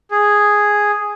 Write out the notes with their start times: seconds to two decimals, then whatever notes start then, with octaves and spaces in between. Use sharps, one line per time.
0.11 G#4